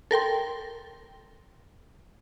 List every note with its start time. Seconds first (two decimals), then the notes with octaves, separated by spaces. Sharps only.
0.11 A4 A#4 G5 C6